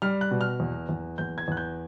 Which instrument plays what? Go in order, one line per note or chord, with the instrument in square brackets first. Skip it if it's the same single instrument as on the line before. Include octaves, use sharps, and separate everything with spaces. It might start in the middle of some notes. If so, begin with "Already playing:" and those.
[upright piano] G3 F6
F#6
B2
F6
E2
E2
E2 G6
G#6
E2 F#6
G6